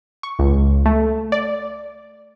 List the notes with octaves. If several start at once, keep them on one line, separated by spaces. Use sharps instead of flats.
C#6
C#2
A3
D5